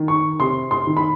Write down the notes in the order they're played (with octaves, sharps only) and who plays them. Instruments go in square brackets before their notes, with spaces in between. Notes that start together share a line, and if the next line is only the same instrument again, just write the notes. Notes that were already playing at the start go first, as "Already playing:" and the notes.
Already playing: [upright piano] D#3
C#6
C3 C6
C6
D#3
B5